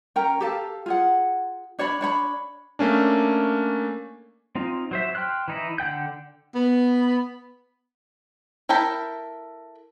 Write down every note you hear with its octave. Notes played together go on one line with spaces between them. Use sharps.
C#4 A#4 G5 A#5
G4 A4 F5
F4 G#4 F#5
D4 C#5 D5 B5
D4 C#5 B5
A3 A#3 C#4 D4
C4 D#4 F4
F#3 C5 E5
G5 C6 F6 F#6
E3 D#4 E4
D3 F#5 G5 G6
B3
E4 A4 A#4 G5 B5